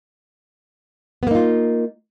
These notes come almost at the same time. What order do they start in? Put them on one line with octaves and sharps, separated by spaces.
B3 A#3 D#4 F4